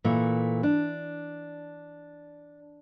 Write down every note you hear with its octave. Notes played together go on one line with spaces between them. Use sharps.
A#2 E3 A3
D4